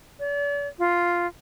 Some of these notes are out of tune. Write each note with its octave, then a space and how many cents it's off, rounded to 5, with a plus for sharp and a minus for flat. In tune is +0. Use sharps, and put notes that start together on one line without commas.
D5 -40
F4 +0